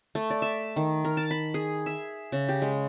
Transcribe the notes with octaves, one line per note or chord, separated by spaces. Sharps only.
A3
D5
E5
D#3
A#4
A5
B5
G#4
E5
C#3
G4
G#3